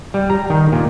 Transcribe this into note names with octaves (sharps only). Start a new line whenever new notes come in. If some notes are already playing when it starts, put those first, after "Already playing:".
G3
A#5
D#3
A#2